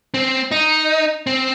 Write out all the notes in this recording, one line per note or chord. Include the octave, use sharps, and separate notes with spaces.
C4
D#4
C4